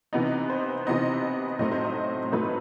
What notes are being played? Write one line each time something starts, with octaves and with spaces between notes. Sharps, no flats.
C3 E3 B3 D#4 D#5
C5
C3 E3 B3 D#4 D#5
A2 F#3 A3 C4 D#4 D#5
C5
D#5
A2 F#3 A3 C4 D#4 B4